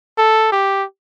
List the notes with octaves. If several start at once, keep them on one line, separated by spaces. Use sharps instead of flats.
A4
G4